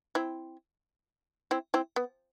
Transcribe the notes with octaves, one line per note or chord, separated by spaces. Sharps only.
C4 E4
C4 E4
C4 E4
B3